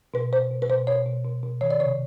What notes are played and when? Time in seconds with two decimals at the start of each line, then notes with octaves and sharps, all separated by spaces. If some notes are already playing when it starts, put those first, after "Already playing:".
0.14 B2 B4
0.33 B2 C5
0.51 B2
0.62 B4
0.70 B2 C5
0.87 B2 C#5
1.06 B2
1.25 B2
1.43 B2
1.61 D#3 C#5
1.71 D5
1.80 C3 C#5